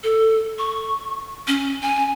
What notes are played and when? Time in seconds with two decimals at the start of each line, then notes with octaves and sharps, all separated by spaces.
0.04 A4
0.59 C#6
1.48 C#4
1.83 G#5